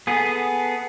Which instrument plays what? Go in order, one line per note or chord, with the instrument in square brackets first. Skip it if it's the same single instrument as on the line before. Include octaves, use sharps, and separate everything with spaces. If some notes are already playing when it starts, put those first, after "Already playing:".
[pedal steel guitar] B3 G#4 A4